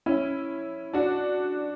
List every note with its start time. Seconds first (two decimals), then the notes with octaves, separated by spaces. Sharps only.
0.06 C#4 E4
0.93 D4 F#4